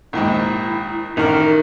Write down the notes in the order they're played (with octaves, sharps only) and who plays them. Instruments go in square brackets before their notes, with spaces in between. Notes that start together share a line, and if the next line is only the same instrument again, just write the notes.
[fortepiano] A#1 D#2 G#2 [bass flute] E4
[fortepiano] A1 A#4 [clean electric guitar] D#3